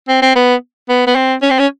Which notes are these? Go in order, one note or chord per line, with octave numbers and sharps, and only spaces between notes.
C4
C4
B3
B3
B3
C4
C#4
C4
C#4